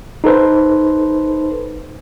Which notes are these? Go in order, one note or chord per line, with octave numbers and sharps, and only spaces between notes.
D#4 A4 B4 C5